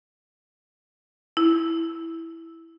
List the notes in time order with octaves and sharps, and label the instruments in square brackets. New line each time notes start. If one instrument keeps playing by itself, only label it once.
[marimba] E4